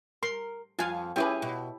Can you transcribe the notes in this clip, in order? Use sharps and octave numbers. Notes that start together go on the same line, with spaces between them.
A#4 C6
F2 F4 F5 G#5
C#4 E4 G4 G#4 B4 G5
B2